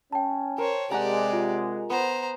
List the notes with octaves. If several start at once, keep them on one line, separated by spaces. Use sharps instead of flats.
C#4 G5 A5
A#4 C5 C#5
C3 G#3 G4 D5 F#5 G#5 A#5
F4
B3 C5 A#5